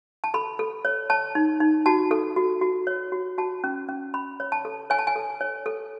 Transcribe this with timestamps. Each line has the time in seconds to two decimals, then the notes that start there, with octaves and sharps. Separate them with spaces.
0.24 A5
0.34 A4 B5
0.59 A4
0.85 C#5
1.10 C#5 A5
1.35 D#4
1.60 D#4
1.86 F#4 A5
2.11 A4
2.36 F#4
2.61 F#4
2.87 C#5
3.12 F#4
3.38 F#4 A5
3.64 C#4
3.89 C#4
4.14 C#4 B5
4.40 C#5
4.52 A5
4.65 A4
4.90 C#5 G#5
4.99 A5
5.07 G#5
5.16 A4
5.41 C#5
5.66 A4